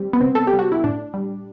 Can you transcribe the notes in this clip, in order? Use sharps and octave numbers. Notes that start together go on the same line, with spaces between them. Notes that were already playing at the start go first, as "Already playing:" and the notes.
Already playing: G3 C4
B3
C3 C4
A4
G4
G3
F#4
E4
A2 D4
G3